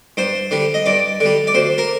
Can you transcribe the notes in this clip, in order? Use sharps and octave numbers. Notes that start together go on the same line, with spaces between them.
G2 C5
D3 G3
D#5
G2 D5
D3 G3
D5
D2 C5
A#4